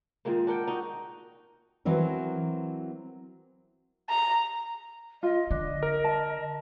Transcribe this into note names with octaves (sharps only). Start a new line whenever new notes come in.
A#2 D#3 G#3 A#3
D4 A#4 F#5 G5
D#4 F#4
E3 F#3 C4 A#4
A#5
F4 D#5
D3 D4
A#4
A5